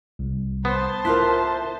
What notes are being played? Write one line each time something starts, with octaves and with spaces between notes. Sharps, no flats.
C2
B3 C5 A5
E4 F4 A#4 C6 F#6 B6